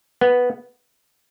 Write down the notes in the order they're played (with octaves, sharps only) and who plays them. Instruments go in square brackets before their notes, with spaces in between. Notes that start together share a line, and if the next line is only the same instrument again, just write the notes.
[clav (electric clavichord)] B3